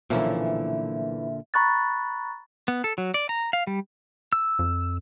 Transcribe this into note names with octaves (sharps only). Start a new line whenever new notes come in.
B1 A#2 D3 E3 F3 A#3 C#4 E5
A#5 B5 C#6 F#6 A6
B3
A4
F#3
D5
A#5
F5
G3
E6
F2